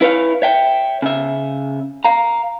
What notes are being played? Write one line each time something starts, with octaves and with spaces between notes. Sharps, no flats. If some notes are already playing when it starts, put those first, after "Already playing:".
E4 B4 C#5 F5
C#5 E5 G5
C#3 E5
F5 A#5